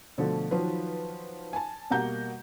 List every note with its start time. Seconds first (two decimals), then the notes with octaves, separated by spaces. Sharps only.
0.18 B2 D3 F3 A3 A4
0.51 D#3 F3 F#3 F4 B4
1.53 G#5 A5
1.90 B2 G3 A#3 F#5 A#5 G6